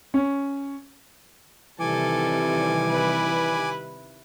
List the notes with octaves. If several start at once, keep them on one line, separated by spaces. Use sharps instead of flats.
C#4
C3 D#3 E3 G3 A4 G#5 D6
E4 B4